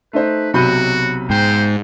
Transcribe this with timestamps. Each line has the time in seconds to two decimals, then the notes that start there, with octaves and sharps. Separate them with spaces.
0.13 A3 D#4 B4 C5
0.54 B1 C3 F#3 F#4 B5 G6 D#7
1.30 G#2 C5 G5